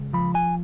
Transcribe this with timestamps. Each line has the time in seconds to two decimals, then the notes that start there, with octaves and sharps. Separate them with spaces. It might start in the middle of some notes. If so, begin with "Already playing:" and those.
Already playing: C#2
0.13 F3 B5
0.35 G#5